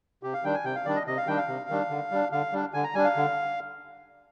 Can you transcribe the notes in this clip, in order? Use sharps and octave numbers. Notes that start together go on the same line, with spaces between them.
C3 G4
F5
D#3 G3 D4 G5
G#5
C3 G5
F5
D#3 G3 D4 D5
D#5
C3 D#5
F5
D#3 G3 D4 G5
F5
C3
D#3 G3 D4
D3
G3 D4
D3 F5
G3 D4
D3 G#5
A#5
G3 D4 G#5
F5
D3